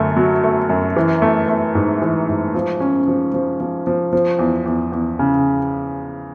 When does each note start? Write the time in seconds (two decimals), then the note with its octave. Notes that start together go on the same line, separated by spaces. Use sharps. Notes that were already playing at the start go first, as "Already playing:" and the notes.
Already playing: F#2 D3 A3
0.16 F#3
0.44 A3
0.69 F#2
0.96 E3
1.22 A3
1.48 A3
1.75 G#2
2.02 E3
2.29 G#2
2.54 F3
2.80 C#4
3.08 F3
3.34 F3
3.60 F3
3.87 F3
4.13 F3
4.39 E2
4.66 E2
4.92 E2
5.19 C#3